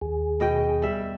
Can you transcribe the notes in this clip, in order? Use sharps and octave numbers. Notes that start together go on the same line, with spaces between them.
D#2 G#4
B2 D#5 G5
G3 E5